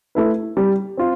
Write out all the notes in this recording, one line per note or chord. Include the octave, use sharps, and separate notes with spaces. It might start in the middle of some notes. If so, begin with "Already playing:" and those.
A3 E4 B4
G3
C4 F4